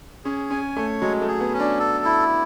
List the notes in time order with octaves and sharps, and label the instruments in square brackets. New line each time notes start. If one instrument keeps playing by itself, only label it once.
[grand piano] C#4 [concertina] G#4
[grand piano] C#4 [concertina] G#5
[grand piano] A3 [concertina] C#5
[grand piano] F#3 [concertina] G#3
[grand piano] A3
[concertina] G#4
[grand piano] B3
[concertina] C#4
[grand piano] D4
[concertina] A4
E4